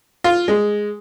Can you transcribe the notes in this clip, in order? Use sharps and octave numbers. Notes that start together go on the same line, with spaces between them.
F4
G#3